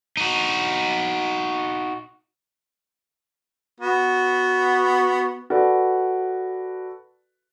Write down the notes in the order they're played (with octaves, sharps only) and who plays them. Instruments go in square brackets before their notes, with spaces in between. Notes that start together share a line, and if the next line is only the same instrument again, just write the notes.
[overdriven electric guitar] D#4 F#4
[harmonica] B3 F#4
[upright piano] F#4 A4 B4 D5